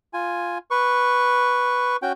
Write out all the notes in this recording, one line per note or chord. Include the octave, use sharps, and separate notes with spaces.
F4 G#5
B4 C#6
C#4 F#4 G5